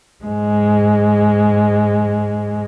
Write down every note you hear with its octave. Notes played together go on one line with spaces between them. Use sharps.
G#2 G#3